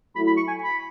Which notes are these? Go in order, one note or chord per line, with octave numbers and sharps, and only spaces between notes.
F#3 A3 E4 B5
B5
C#6
G#5
B5